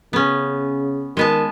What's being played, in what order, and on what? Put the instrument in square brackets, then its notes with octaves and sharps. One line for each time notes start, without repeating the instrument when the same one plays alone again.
[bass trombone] C#3 [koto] B3 C#4
[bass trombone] D#3 [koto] G#3 B3 A5